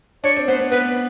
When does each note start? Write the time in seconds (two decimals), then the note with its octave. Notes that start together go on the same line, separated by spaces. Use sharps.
0.24 D4 C#5
0.36 C4
0.48 B3 C5
0.60 B3
0.71 B3 B4